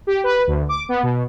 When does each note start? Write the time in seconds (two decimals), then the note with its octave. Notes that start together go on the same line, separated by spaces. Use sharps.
0.07 G4
0.24 B4
0.47 D2
0.69 D6
0.89 B3
1.03 B2